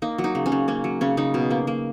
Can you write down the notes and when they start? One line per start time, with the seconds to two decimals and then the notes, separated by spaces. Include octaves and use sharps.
0.02 A#3 D#4
0.18 F#3
0.24 D#4
0.35 C#3
0.46 C#4
0.52 C#3
0.68 A#3 C#4
0.84 F#3
1.01 C#3 C#4
1.17 C#3 D#4
1.34 B2
1.51 A#3
1.67 A#3